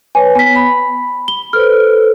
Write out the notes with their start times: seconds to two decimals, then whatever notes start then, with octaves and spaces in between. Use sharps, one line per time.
0.15 B4 C#5 G#5
0.35 B3 G#5 B6
0.56 B5
1.28 G7
1.53 A4 B4 C5 F6